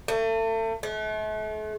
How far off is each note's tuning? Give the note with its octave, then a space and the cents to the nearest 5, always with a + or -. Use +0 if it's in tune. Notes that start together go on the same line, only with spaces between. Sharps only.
A3 +35
A3 -40